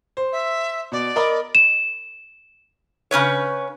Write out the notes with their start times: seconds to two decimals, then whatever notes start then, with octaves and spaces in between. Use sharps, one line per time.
0.17 C5
0.32 E5
0.92 B2 D5
1.16 A#4 D#5 B5
1.55 E7
3.11 C#3 C#4 B4 C#5